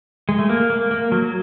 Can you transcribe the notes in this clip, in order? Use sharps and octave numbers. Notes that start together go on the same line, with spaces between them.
G#3
A3
A#3
A#3
A#3
F#3